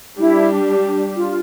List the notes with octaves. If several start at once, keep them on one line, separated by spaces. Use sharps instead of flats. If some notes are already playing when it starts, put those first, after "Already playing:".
G3 D4 E4 G4
F4